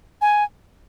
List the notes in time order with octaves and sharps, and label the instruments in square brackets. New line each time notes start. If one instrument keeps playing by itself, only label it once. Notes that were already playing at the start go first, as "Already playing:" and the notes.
[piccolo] G#5